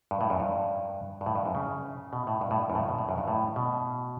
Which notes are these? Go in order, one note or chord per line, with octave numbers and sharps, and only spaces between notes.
G2
A2
F#2
G2
G2
A2
G2
F#2
C#3
B2
A2
G2
A2
G2
F#2
A2
G2
B2
A2
F#2
G2
A2
B2